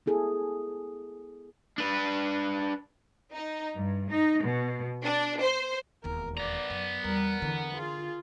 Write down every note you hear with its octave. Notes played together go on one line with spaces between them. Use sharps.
B3 E4 G#4 A4
D4 B4
D#4
G2
D#4
B2
D4
C5
E1 D#2 A#4
B3 D5 A#5
F#2
E2 G3 A#4
E2 D3
F4 G#4